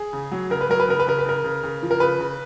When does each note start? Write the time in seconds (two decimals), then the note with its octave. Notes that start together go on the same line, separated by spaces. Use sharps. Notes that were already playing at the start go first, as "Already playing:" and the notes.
Already playing: G#4
0.13 C#3
0.32 F#3
0.50 C#3 A#4
0.61 B4
0.69 F#3 A#4
0.80 B4
0.88 C#3 A#4
1.00 B4
1.07 C#3 A#4
1.19 B4
1.25 C#3 A#4
1.44 C#3
1.63 C#3
1.83 F3
1.91 A#4
2.00 C#3 B4
2.19 C#3